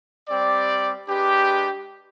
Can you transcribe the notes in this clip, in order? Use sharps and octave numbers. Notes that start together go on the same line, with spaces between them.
G3 C4 G4 D5
G#3 D4 G4 B4